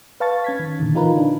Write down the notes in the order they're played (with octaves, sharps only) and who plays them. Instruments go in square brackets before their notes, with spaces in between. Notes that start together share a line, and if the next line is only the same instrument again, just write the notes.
[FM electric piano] B4 F5 A5 C#6 A6
C#4 G#6 B6
D#3
A#2 D3 D#3
E3 D#4 F4 A#4 B4
D4